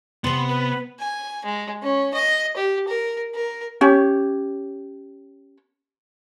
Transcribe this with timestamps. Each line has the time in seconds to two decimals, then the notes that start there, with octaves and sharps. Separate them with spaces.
0.24 C3 B3 C4 C6
0.49 B4
0.99 G#5
1.45 G#3
1.82 C#4
2.14 D#5
2.57 G4
2.88 A#4
3.35 A#4
3.81 C#4 G4 C#5